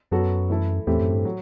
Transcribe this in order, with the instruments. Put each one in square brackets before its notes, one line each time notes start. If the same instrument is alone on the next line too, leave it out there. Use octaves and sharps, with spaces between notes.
[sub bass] F#2 [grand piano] F#3 B3 F#4 A4
[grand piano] E3 A3 E4 A4
[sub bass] E2 [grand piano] A2 E3 A3 C4 G4
[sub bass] F#2
G2
[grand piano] F#3